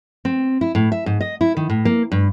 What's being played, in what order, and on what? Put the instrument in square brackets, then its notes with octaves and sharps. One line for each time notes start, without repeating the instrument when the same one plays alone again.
[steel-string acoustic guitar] C4
E4
A2
E5
G#2
D#5
E4
D#3
A2
A#3
G2